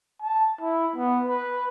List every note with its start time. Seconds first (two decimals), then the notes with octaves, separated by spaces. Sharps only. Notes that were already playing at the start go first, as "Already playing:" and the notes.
0.22 A5
0.61 E4
0.96 B3
1.25 B4